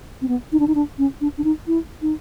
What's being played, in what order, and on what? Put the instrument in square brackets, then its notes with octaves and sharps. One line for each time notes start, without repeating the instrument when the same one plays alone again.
[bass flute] C4
B3
D#4
D4
D#4
D4
C#4
D4
D4
D#4
E4
D#4